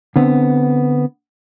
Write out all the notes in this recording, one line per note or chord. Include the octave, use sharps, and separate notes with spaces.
D3 B3 C4